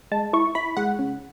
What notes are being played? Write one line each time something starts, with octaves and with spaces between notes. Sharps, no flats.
G#3 A5
E4 C#6
E4 B5
G#3 F#5
C#3